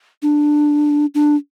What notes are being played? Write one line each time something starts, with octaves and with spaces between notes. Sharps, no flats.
D4
D4